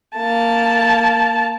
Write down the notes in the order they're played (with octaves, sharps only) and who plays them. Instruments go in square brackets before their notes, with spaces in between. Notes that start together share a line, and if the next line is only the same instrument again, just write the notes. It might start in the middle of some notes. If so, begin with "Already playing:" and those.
[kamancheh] A#3 A5